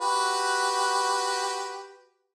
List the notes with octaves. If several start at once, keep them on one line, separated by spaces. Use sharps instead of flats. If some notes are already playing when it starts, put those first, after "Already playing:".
F#4 G4 B4